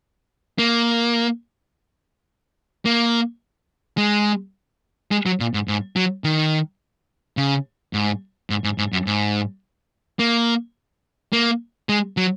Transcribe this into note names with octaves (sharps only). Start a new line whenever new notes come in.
A#3
A#3
G#3
G#3
F#3
A#2
G#2
G#2
F#3
D#3
C#3
G#2
G#2
G#2
G#2
F#2
G#2
A#3
A#3
G#3
F#3